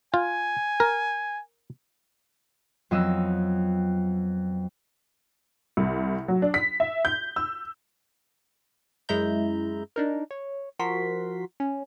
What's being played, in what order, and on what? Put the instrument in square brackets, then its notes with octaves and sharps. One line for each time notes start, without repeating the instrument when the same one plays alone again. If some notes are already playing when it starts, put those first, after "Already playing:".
[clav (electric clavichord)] F4 [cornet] G#5
[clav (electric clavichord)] A#4
[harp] F2 F#3 B3 D#5 E6
[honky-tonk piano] C2
F#3
D4
B6
E5
G6
E6
[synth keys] F#2 G#3 E4 E5 A#5 G6
D4 D#4 A#4
C#5
F3 F#4 A#4 C6 B6
C#4